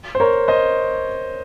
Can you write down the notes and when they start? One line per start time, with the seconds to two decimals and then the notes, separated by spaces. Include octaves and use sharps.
0.15 C5
0.20 A#4 C#5
0.48 C5 D#5